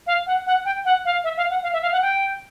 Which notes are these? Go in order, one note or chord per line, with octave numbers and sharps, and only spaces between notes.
F5
F#5
F#5
G5
F#5
F5
E5
F5
F#5
F5
E5
F5
F#5
G5